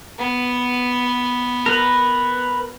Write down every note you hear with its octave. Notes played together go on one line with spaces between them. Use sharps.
B3
A#4 B4